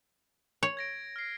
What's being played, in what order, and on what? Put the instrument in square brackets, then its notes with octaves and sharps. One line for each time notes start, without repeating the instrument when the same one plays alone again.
[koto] C#5
[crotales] G#6 A#6 D7
F6 C7